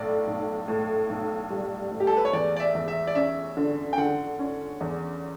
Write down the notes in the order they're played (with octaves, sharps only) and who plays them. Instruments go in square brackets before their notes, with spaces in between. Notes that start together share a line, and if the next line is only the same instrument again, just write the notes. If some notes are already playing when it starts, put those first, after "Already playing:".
Already playing: [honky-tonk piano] B1 A2 [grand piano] D5
[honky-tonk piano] B1
A2
B1
G3
A2
[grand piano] G4
A4
B4
C#5
[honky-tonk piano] E2 [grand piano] D5
[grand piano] D5
E5
[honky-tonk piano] E2
[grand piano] E5
D5
[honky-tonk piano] C#4 [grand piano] E5
[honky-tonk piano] D3
[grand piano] G5
[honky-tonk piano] D3 [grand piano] F#5
[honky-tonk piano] C#4
E2